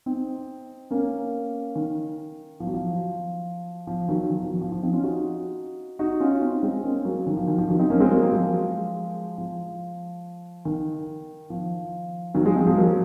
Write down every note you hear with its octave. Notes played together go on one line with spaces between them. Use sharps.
C4 D#4
A#3 C#4
D#3
F3
F#3
F3
F3
D#3 F#3
D#3
F3
F3
F3
F3
C4 D#4
C#4 F4
D#4 F#4
D#4 F#4
C#4 F4
C4 D#4
G#3 C4
A#3 C#4
F#3 A#3
D#3
F3
D#3
F3
D#3 F#3
C4 D#4
A#3 C#4
G#3 C4
F#3 A#3
F3 G#3
F3
D#3
F3
D#3 F#3
F3 G#3
G#3 C4
F3 G#3
F#3 A#3